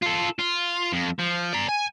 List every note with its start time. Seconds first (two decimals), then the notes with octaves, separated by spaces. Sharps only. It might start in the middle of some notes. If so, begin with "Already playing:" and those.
0.02 F4 A4
0.39 F4
0.93 F2
1.19 F3
1.53 D5 A#5
1.69 G#5